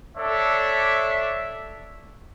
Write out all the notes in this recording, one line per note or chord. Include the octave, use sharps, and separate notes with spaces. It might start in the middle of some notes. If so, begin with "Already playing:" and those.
D4 A4 C#5 E5